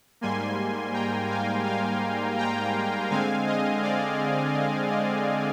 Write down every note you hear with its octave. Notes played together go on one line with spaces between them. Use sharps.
G#2 G3 A#3 G#5 C6
G5 A#5
F5 G#5
F5 G#5
G5 A#5
D3 G#3 C4 F5 G#5
D#5
D5 F5
D#5
D#5